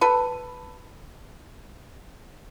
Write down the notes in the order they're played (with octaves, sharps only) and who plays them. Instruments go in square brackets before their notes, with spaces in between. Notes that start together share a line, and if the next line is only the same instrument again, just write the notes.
[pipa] A4 B4